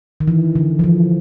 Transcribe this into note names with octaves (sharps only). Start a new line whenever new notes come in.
D#3
E3
D3
F3
E3